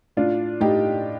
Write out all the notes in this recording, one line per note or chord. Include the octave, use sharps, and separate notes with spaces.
A2 D4 F4
A2 D#4 G4